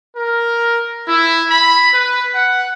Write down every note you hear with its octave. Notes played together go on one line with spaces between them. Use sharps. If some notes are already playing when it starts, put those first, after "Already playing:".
A#4
E4
B5
B4
F#5